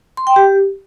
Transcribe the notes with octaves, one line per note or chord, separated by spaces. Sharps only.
C6
G5
G4